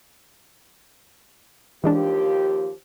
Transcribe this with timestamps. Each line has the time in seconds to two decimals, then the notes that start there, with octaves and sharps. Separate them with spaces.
1.84 D#2 E3 F3 G#3 D4 G4